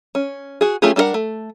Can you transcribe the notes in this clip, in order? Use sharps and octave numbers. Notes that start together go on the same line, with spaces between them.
C#4
F#4 G#4
A3 C#4 F4 G4 G#4
G3 D4 G#4 A#4 F#5
A3